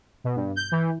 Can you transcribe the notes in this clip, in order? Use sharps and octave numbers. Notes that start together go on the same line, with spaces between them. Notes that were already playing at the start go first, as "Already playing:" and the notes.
B2
G2
G6
E3